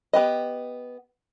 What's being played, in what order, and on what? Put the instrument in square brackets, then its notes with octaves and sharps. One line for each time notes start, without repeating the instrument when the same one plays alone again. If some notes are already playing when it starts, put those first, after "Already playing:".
[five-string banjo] B3 G4 D#5